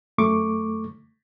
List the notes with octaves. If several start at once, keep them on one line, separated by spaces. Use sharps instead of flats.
F#2 A3 C#6 D6